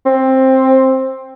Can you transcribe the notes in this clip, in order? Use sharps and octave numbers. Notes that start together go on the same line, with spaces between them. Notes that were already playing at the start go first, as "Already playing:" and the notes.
C4